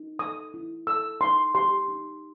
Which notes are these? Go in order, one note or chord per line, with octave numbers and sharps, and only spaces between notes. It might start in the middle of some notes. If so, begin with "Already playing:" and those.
Already playing: D#4
A4 D#6
E4
A4 E6
D#4 C6
G4 C6
D#4